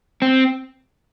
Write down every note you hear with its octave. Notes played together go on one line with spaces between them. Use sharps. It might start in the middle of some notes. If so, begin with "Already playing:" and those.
C4